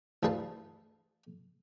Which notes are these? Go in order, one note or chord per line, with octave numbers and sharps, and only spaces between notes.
A1 D2 G#4 B4 F5 A5